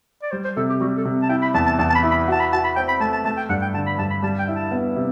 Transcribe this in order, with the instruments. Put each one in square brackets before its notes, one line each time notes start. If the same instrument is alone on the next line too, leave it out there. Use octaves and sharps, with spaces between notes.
[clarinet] D5
[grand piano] G3 [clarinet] C5
[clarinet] C5
[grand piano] C3 [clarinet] A4
[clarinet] G4
[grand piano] G3 [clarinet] F#4
[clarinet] A4
[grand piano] C3
[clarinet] A5
[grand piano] E4 [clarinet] G5
[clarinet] B5
[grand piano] E2 [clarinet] A5
[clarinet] A5
[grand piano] E2 [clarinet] A5
[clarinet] A5
B5
[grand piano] E4
[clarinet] B5
[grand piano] F#4 [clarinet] A5
[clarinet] B5
[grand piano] F#4 [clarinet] A5
[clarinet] B5
[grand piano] C4 [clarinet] G5
[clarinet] B5
[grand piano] A3 [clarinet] A5
[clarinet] A5
[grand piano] A3 [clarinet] A5
[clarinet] G5
[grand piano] G2 [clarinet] F#5
[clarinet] G5
[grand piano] D3 [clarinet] A5
[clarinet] B5
[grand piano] G2 [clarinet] A5
[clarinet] B5
[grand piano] G3 [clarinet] A5
[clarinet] G5
[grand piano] E4
[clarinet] A5
[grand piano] B3
C3